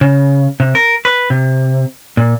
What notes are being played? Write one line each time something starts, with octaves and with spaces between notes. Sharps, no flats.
C#3
C3
A#4
B4
C3
A#2